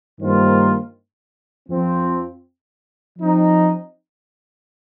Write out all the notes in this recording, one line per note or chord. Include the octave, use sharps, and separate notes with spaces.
G2 D#3 A#3 F4 C5
F2 F3 C4
F3 C4 D#4